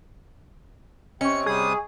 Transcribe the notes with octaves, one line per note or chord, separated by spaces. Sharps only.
C3 C4 C#4 D#5 C#6 C#7
C3 G3 G#4 D#6